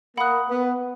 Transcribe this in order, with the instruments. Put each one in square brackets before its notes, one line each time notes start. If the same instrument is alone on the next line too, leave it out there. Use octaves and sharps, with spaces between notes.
[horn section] A#3 [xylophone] F#5 B5 D#6 F#6
[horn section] B3